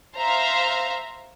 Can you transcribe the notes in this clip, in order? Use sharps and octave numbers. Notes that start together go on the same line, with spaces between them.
C5 E5 F5 A#5 C6